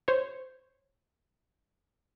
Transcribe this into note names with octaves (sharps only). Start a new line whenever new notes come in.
C5 C#5